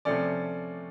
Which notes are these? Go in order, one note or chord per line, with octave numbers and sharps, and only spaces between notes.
C3 F3 A3 C#4 D5